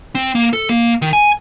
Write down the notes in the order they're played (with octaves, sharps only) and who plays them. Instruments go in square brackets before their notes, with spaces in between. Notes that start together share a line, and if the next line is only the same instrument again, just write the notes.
[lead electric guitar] C4
A#3
A4
A#3
D#3
G#5